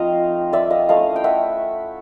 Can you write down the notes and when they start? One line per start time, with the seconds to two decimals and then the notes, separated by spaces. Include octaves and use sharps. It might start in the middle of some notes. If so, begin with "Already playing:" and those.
Already playing: F3 A3 C4 D#4 D#5 F5
0.53 D5 E5
0.70 D#5 F5
0.89 A3 C#4 E4 D#5 F5
1.16 G5
1.24 E5 F#5